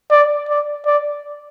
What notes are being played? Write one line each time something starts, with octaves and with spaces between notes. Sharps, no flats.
D5
D5
D5